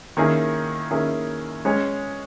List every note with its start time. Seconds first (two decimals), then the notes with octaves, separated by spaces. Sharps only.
0.17 D#3 A#3 C#4 E4 G#4
0.91 D#3 A#3 C#4 E4 G#4
1.65 G#3 C#4 G#4 C#5